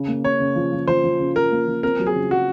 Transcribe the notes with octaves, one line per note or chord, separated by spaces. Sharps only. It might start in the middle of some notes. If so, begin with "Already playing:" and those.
Already playing: C#3
A#3
C#3 C#5
C#3
F3
F3
F3 C5
F3
C#3
C#3 A#4
A#3
F3
C4 A#4
F#3
G#4
C#3
F#3 F#4